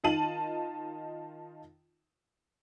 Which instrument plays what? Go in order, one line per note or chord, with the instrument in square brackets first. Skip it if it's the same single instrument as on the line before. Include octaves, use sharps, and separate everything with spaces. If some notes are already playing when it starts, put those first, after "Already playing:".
[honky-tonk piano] D#3 D#4 F4 A5 D#7 F#7